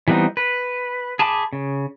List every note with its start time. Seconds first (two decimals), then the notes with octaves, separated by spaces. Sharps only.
0.08 E3 G3 B3 C4 D#4
0.37 B4
1.19 G#4 A5 B5 D6
1.53 C#3